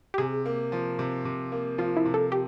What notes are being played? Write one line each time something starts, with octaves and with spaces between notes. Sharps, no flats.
G4
C3 G#4
A#3
F3
C3
C3
A#3
F3 F4
E4
C3
A4
G4